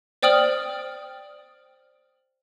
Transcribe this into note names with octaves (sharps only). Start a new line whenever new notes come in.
C5 D5 G5 D#6 F6 F#7